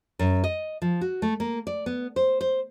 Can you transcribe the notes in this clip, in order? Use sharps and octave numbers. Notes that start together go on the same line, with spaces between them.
F#2
D#5
F3
F#4
A3
A#3
D5
B3
C5
C5